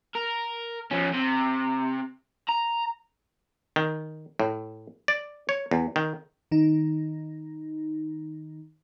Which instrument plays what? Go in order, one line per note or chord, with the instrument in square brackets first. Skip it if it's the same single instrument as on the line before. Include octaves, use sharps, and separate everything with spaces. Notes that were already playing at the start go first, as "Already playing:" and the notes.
[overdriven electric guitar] A#4
F3 C#4
C3
A#5
[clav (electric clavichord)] D#3
A2
D5
C#5
E2
D#3
[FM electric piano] D#3 D#4